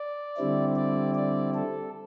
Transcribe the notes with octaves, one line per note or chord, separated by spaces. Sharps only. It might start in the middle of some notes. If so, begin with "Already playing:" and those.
Already playing: D5
D3 G3 C4 E4
D5
D5
A4